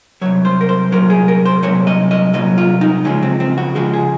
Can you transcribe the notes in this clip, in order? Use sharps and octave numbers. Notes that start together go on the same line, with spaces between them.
C2 A#2 F#3 C#5
C5
A#4
C5
C2 A#2 F#3 A#4
G#4
A#4
C5
C2 A#2 F#3 C#5
D#5
D#5
C2 A#2 F#3 D#5
F4
D#4
C#2 C#3 F3 G#3 C#4
C4
C4
F#4
C#2 C#3 F3 G#3 F#4
G#4